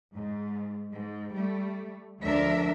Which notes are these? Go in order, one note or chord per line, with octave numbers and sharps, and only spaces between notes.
G#2
G#2
G3 A3
D2 F3 D4 A#4 E5